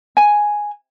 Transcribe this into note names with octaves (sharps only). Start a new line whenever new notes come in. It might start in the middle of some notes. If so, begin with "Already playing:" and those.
G#5